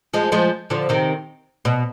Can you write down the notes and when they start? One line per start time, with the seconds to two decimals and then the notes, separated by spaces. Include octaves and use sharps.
0.13 F3 G#3
0.32 F3 G#3
0.70 D3 F3
0.89 C3 D#3
1.65 B2